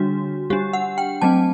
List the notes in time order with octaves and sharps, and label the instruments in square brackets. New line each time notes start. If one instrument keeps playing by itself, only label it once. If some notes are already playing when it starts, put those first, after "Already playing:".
Already playing: [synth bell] D3 G3 D4 F#4
G3 D4 G4
F#5
G5
F#3 A3 C4 A5